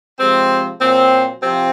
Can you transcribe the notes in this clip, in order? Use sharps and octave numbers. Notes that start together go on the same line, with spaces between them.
C3 F3 G#3 C4
A#2 F#3 C4
C3 F3 C4